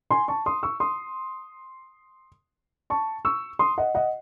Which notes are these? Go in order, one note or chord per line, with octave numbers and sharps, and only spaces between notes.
G#5 C6
A5 C#6
C6 D#6
C#6 E6
C6 D#6
A5 C#6
C#6 E6
C6 D#6
D#5 F#5
D#5 F#5